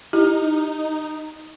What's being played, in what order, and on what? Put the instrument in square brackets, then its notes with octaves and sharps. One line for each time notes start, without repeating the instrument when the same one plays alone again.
[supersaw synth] D#4 [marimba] E4 G4